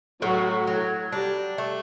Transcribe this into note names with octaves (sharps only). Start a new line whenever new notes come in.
A2 F#3 F#4
F#3
G3 D4 G4
A3